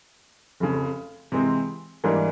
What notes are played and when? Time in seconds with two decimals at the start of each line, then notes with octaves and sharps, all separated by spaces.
0.60 F1 F2 C#3
1.32 C3 E3 G#3 C4
2.04 G#2 E3 G3 A#3 D4